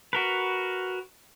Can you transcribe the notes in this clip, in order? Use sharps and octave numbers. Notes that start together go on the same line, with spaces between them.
F#4 A#4 B4